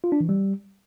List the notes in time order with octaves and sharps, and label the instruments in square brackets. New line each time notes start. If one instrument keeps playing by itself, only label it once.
[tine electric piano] F4
D4
E3
G3